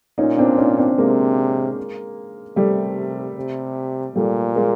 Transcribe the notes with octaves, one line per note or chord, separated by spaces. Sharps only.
A#2 C#4 D#4
C4 D4
C#4 D#4
C4 D4
C3 G#3 A#3
C3 G3 A3
C3
A#2 G3 A3
G#3 A#3